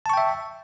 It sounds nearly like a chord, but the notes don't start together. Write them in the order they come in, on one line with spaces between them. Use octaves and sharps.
A5 C#6 G5 E5